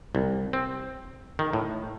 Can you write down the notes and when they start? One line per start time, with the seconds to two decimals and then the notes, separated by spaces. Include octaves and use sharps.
0.15 C2
0.53 C4
1.39 D#3
1.53 A2